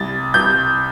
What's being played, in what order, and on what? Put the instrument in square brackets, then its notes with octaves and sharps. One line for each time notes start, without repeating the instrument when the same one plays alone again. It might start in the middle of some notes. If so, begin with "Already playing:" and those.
Already playing: [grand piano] C2 A6
C2 G6